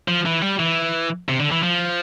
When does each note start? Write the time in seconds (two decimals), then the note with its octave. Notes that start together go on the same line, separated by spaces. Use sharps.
0.08 F3
0.26 E3
0.42 G3
0.59 E3
1.29 C3
1.40 D3
1.52 E3
1.63 F3